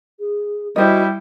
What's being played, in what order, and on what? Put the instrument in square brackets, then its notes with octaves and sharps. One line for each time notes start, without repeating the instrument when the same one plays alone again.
[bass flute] G#4
[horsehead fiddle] G3 E4 [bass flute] F#4 [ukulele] C5 D#5